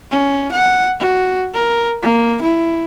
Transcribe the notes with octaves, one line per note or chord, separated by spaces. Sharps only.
C#4
F#5
F#4
A#4
A#3
E4